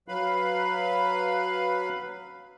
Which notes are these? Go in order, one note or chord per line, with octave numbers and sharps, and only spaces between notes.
F#3 B4 F5 B5